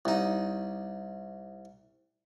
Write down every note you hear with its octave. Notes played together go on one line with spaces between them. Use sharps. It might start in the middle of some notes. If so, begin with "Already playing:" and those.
C2 D#4